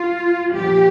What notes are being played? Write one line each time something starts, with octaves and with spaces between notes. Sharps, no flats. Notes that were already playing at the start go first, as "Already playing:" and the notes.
Already playing: F4
A#2 F3 G4